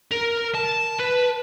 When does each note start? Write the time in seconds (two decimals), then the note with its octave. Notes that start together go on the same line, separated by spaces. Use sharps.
0.12 A#4
0.55 A5
1.00 B4